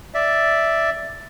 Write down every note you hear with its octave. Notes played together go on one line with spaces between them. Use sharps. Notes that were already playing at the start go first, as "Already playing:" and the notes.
D5 E5